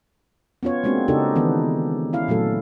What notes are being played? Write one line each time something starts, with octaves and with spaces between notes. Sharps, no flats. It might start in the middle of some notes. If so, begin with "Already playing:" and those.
B3 C#4 F4 C#5
G#3 A#3 C4 D4 F#4
C#3 D4 D#4 F#4 G4 A4
D#3 E3 B3
C#4 E4 F5
A#2 F#3 A3 A4